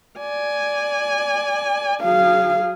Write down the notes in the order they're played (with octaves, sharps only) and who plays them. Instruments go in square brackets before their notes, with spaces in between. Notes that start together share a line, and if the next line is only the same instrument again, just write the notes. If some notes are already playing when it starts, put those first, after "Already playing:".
[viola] D5 G#5
[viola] F#3 G#4 [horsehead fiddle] F5